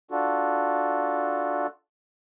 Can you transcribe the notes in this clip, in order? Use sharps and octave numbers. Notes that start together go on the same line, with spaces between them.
D4 F4 F#4 A4